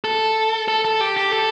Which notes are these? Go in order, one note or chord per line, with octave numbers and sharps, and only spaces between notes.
A4
A4
A4
G4
G4
A4